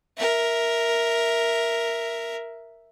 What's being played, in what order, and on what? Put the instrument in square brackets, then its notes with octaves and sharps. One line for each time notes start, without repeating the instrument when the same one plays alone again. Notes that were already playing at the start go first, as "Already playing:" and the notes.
[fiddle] A#4 E5